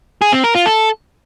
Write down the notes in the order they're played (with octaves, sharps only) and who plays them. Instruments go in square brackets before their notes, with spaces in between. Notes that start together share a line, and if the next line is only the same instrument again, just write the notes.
[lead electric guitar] G#4
C4
A#4
F4
A4